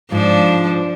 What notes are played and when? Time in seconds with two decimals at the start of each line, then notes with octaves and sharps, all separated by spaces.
0.11 G#2 F3 D4 F4